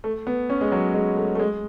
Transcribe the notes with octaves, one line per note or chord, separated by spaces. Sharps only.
A3
B3
C#4
G#3
F#3
G#3
A3
A3
G#3